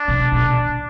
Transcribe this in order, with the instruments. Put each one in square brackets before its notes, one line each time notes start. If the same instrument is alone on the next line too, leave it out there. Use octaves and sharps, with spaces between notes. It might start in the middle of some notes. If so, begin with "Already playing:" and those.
Already playing: [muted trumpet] D4
[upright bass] C3
B2